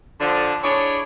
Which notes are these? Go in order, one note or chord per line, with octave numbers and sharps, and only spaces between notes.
D3 F3
D4 E4 G#4 C#5